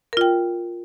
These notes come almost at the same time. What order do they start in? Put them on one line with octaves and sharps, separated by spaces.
A#4 F4 G5